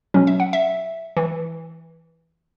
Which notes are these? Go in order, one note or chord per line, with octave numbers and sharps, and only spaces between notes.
B2 F#3 C#4
E5
F#5
E5
E3